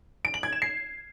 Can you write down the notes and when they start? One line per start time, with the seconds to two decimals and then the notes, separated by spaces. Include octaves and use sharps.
0.25 D7
0.34 F#7
0.43 G#6
0.52 E7
0.62 C7